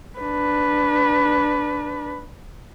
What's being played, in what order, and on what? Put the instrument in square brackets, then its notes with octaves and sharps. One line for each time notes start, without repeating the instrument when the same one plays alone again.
[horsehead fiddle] D4 B4